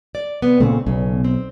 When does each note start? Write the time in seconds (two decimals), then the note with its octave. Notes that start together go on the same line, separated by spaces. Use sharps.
0.15 D5
0.42 C3 B3
0.60 A#2 C#3 A3 C4
0.87 B1 C#3
1.24 C4